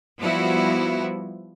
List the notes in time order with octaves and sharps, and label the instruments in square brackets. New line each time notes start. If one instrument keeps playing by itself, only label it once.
[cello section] F3 G3 B3 E4 F#4